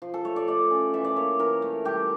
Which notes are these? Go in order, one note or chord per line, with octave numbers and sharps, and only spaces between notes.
F3
A4
A3 C#5
D5
A3 D5
C#4
E3 E5
D5
A#3 C#5
E3 A#4
A3
G3 G4